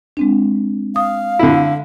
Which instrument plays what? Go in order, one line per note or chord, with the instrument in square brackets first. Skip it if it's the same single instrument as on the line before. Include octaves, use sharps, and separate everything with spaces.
[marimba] G#3 C4 D4
[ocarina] F5 [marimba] D#6
[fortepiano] D3 E4